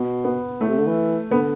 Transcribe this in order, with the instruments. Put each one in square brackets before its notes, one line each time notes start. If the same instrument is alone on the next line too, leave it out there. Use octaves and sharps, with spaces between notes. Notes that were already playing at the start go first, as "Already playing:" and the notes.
Already playing: [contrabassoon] B2
[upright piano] B3
[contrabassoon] A2 [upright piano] A3
[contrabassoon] C3
D3
E3
[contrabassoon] D3 [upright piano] B3